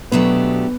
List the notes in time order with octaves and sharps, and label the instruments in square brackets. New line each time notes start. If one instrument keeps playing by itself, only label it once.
[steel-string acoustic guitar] B2 F#3 A3 D4 G4 [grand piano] B3